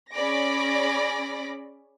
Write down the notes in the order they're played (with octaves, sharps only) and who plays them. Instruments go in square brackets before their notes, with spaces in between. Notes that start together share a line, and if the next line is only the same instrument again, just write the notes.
[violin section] C#4 G#4 D5 B5 D6 A#6